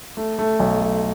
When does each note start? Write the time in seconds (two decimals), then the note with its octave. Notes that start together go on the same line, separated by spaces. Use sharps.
0.17 A3
0.39 A3
0.59 B1
0.81 A3